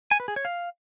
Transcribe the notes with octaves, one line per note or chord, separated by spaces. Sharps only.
G#5
B4
G#4
C#5
F5